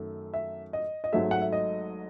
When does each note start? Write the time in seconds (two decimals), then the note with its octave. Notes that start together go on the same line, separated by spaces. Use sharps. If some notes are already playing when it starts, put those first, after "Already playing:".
Already playing: F#2 D#3 F#3 A3
0.34 E5
0.73 D#5
1.04 D#5
1.13 G#1 G#2 F#3 A3 E5
1.31 F#5
1.42 E5
1.52 D#5